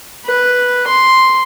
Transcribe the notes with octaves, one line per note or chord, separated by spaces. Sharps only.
B4
C6